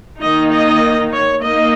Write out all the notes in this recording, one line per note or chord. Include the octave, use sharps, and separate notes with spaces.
D#3 A#3 D#4 D#5
D#5
C#5
A#3 D#4 D#5